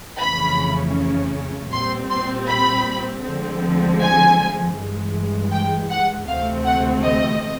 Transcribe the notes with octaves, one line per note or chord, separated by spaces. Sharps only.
F2 C#3 E3 A3 C#4 B5
A#2 G3 C4 C6
C6
B5
D2 D3 F3 G#3 C4
G#5
G2 E3 G#3
G5
F#5
D2 C3 E3 A3 C4 F5
F#5
D#5